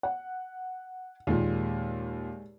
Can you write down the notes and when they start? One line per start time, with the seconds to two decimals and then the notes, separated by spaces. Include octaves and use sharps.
0.03 F#5
1.27 D#2 A#2 G#3